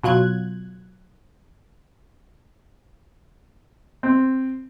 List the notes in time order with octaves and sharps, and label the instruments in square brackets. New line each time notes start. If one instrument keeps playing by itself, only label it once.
[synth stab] B2 F#3 F4 F#6 G#6
[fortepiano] C4